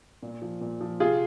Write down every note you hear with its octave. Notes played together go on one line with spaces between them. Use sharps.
A#2
F3
A#2
F3
C3 F4 G#4